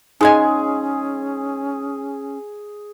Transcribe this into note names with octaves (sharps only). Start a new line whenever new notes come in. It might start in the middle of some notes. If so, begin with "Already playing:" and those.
F3 G#3 C#4 D#4 G#4 D#5 G#5